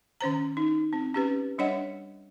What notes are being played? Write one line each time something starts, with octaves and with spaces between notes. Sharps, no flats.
D#3 C#4 C5 A#5
D#4
C4
C#4 G4 B4
G3 D4 C#5 D#5 F#5